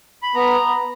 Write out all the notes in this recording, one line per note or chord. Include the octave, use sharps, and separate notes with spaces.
B5
B3 A#5